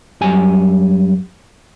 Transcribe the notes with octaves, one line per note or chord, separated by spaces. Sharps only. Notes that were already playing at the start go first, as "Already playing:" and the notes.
F#2 G3 G#5